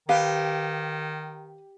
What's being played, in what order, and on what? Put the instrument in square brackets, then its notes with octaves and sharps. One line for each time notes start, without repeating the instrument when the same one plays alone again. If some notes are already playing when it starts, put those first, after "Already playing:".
[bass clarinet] D#3 [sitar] G4 [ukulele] B4 F5